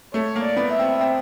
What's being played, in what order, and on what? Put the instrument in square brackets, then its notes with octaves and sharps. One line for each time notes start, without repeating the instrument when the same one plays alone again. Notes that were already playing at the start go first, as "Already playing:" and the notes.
[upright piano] A3 [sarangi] C#5
[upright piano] A#3
[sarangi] D5
[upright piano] B3
[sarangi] E5
[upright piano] C4
C4